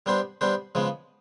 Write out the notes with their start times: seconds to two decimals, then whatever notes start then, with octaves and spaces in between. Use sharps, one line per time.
0.06 G3 B3 D4 G4 C5
0.41 G3 B3 D4 G4 C5
0.75 C#3 F3 G#3 B3